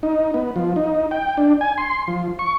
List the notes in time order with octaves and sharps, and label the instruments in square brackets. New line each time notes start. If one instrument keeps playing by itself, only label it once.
[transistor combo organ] D#4
B3
F3
D#4
G5
D4
G#5
C6
F3
C#6